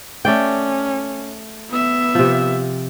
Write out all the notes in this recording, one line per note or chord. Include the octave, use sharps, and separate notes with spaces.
A3 C#4 D5 G5
B3 E5
C3 F3